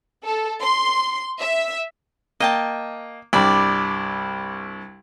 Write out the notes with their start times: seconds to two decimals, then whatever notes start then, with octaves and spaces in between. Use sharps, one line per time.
0.24 A4
0.60 C6
1.40 E5
2.40 A#3 D#5 G5 A5
3.33 C2 G2 D5 B5